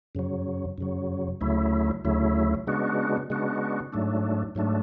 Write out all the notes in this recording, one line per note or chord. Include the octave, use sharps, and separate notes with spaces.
F#2 C#3 F#3
F#2 C#3 F#3
D2 C#3 F#3 A3 E4
D2 C#3 F#3 A3 E4
C#3 G#3 B3 D4 F#4
C#3 G#3 B3 D4 F#4
G#2 F#3 A3 D4
G#2 F#3 A3 D4